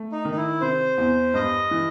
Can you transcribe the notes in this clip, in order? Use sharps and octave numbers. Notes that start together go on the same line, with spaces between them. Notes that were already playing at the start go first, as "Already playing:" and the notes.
Already playing: A3
D#4
D#3
D#4
E4
C3 C5
E2
G2 D#5
E3